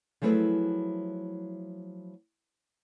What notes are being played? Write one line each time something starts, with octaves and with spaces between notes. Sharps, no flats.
F3 F#3 A3 E4 G#4 B4